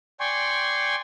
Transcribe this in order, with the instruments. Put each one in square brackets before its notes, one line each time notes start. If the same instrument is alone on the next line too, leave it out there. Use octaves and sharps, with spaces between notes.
[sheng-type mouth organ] D5 G5 G#5 C6 C#6